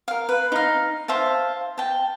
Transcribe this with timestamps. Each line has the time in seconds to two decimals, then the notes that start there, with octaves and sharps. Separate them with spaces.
0.08 A#4 F5
0.29 B4
0.52 D#4 F5
1.08 C5 E5 F5 A5
1.78 G5 A5